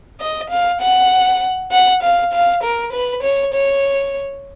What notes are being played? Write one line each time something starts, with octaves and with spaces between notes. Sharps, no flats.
D#5
F5
F#5
F#5
F5
F5
A#4
B4
C#5
C#5